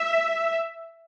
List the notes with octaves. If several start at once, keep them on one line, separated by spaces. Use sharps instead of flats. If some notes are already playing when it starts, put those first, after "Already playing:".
Already playing: E5